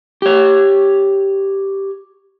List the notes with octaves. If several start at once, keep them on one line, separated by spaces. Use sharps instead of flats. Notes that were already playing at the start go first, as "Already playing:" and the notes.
G4 C#5